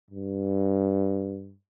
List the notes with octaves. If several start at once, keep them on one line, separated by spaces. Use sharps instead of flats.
G2